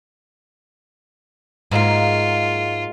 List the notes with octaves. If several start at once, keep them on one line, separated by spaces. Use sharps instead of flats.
G#2 F#3 G#3 A#3 F4